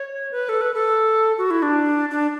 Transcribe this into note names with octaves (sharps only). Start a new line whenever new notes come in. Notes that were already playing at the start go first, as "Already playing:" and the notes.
Already playing: C#5
B4
A4
B4
A4
F#4
E4
D4
D4